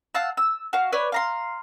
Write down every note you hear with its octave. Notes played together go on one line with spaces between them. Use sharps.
F5 F#5 A5 E6
E6
F#4 F5
B4 C#5 D5
F5 A#5 C6